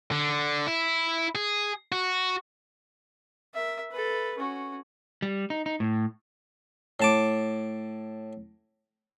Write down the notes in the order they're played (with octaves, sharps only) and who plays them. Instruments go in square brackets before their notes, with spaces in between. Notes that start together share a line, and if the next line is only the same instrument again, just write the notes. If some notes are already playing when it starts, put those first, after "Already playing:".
[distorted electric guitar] D3
E4
G#4
F#4
[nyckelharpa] A#4 E5
A4 B4
C#4 F#4
[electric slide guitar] G3
D#4
D#4
A2
[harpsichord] A2 A5 D6